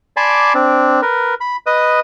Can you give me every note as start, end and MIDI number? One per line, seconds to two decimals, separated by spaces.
0.17 0.53 74
0.17 0.53 80
0.17 0.53 81
0.17 0.53 83
0.17 0.53 84
0.17 0.53 86
0.55 1.01 60
0.55 1.01 62
1.02 1.34 70
1.02 1.34 71
1.40 1.57 83
1.66 2.00 71
1.66 2.00 75
1.66 2.00 87